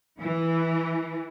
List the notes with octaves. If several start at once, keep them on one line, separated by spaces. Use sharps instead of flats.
E3